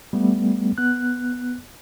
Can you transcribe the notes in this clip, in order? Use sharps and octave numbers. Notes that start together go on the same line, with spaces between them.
G3 A3 B3
B3 F#6